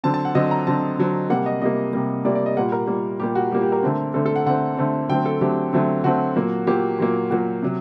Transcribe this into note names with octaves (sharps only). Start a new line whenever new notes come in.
D3 F#3 C4 A5
A5
F#5
D3 F#3 C4 D#5
A#5
D3 F#3 C4 A5
D3 F#3 C4
C3 G3 A#3 F#5
D#5
C3 G3 A#3 D#5
C3 G3 A#3
C3 G3 A#3 D5
D5
D#5
A#2 G3 A#3 F#5
A#4
A#2 G3 A#3
A#2 G3 A#3 G4
F#4
A#2 G3 A#3 G4
G4
A#4
D3 A3 C4
D3 A3 C4 A4
A4
F#5
D3 A3 C4 F#5
D3 A3 C4
D3 F#3 A3 C4 G5
A4
D3 F#3 A3 C4 G4
D3 F#3 A3 C4
D3 F#3 A3 C4 F#4
A#2 F#3 A#3
A#2 F#3 A#3 G4
A#2 F#3 A#3
A#2 F#3 A#3 F#4
C3 F#3